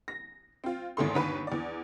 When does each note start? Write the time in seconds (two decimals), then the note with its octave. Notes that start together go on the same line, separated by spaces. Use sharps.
0.08 A#6
0.64 C4 F4
0.97 G#1 E2 A3 C6
1.14 G1 D#2 B4 B5
1.47 E2 D5